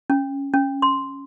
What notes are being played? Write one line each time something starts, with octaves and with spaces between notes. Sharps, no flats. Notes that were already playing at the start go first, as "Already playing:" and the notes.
C#4
C#4
C6